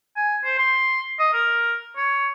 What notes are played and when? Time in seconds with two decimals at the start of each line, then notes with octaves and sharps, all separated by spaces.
0.16 G#5
0.44 C5
0.58 C6
1.19 D#5
1.33 A#4
1.97 C#5